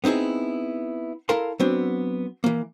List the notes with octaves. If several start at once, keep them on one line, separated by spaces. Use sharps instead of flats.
B3 C4 D#4 E4 G#4
E4 A4 A#4 F5 A5 C6
F#3 B3 C4 D4
E3 A#3